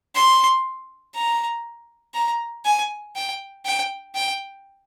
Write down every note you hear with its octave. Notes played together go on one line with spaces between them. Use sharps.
C6
A#5
A#5
G#5
G5
G5
G5